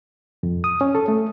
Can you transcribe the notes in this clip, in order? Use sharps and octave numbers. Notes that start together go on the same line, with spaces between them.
F2
D#6
C#4
A4
A3